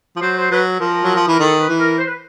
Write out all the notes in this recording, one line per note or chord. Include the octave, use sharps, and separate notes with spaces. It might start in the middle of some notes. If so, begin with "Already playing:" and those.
F3
F#3 C5
C5
F#3 B4
F3 A#4
F#3
F3
E3 A#4
D#3 A4
B4
E3
A#4
C5
B4